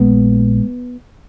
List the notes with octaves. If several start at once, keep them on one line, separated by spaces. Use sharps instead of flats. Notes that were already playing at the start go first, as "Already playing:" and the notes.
Already playing: A#1 A#2 G#3 B3